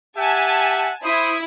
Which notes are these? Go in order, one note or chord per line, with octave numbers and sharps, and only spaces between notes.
G4 E5 F#5 G#5 A5
E4 C5 D#6